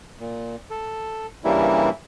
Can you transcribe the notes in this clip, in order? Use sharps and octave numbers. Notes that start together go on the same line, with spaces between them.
A#2
A4
G2 C#3 E3 G3 A#3 E4